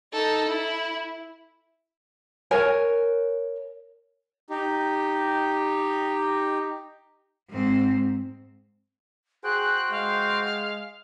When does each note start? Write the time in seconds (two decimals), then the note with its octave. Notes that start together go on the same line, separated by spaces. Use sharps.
0.13 D#4 A4
0.48 E4
2.51 A#4 C#5 G#5
4.50 D#4 G4
7.49 G#2 C4
9.44 F#4 G#4 C5 G5 F#6
9.91 G#3 F5